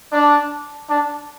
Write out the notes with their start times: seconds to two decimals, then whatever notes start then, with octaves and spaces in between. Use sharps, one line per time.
0.13 D4
0.88 D4